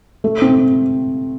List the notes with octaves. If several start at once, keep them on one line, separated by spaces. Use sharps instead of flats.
A3
C4